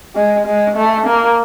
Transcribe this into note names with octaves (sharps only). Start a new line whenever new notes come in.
G#3
G#3
A3
A#3